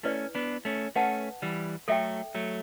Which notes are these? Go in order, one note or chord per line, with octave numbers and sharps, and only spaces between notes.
A3 C#4 E4 B4 D5
B3 D4
A3 C#4
A3 C#4 B4 F#5 A5
E3 G3
F#3 A3 A4 E5 G5
F#3 A3